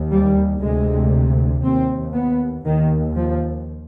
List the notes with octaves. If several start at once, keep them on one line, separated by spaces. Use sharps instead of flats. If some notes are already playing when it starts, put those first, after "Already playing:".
Already playing: D#2
G3
D2 C3 G#3
D#2 C4
B3
D#2 D#3
F3